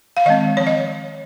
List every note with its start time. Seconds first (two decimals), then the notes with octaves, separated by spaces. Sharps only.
0.17 F5
0.26 D#3 G#3 C4 D#5
0.57 F3 C4 C#5
0.67 D#5